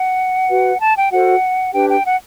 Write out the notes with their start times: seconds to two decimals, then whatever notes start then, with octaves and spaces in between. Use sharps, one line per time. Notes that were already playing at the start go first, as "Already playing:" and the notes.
Already playing: F#5
0.49 F#4 B4
0.81 A5
0.96 G5
1.11 F#4 A4 C5 F#5
1.73 D4 G4 B4 G5
1.90 G5
2.05 F#5